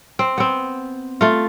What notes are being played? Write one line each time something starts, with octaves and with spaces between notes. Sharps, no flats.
C4
B3 C4
A3 F4